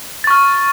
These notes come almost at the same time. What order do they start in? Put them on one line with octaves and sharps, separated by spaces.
A6 C#6 F6